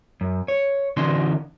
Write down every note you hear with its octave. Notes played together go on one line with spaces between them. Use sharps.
F#2
C#5
D3 E3 C#4 D#4 F#4 C6